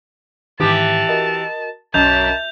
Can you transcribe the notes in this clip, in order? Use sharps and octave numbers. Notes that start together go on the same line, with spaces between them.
G#2 D#3 E3 G4 A5
F#4 A#4 D#5
B1 F#2 D#5 A5 A#5 G6 F7